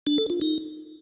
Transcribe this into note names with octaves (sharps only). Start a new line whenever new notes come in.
D4
A4
F4
D#4